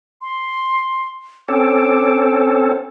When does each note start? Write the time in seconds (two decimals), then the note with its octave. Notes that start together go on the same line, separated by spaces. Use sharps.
0.22 C6
1.48 C4 C#4 A4 D6